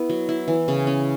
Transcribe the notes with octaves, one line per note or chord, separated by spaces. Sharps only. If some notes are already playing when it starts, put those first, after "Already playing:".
Already playing: B3 E4
F#3
E4
E3
C#3
C#4